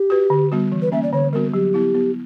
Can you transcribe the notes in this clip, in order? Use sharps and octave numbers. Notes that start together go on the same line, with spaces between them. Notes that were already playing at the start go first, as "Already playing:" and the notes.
Already playing: G4
F#4 B4
D3
G3 B3 F#4
E3
B4
A#3 C#4 E5
D5
D3 C#5
G3 B3 F#4 A#4
F#3 G4
B3 E4
B3